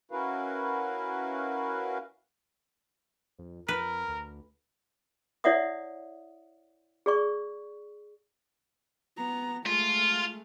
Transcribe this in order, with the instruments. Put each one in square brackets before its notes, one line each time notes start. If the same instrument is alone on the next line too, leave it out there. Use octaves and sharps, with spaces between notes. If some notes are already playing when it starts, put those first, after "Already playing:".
[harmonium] C#4 E4 F#4 A#4 B4 F5
[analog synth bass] F2
[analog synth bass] F2 [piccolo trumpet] A#4 [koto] B4
[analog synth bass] D2
[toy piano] E4 C#5 D5 E5 F#5 D#6
G#4 D5 C#6
[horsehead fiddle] B3 A#5
[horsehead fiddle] G#3 A3 [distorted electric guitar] F4